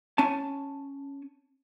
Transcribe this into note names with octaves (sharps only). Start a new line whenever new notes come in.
C#4 G#5 A5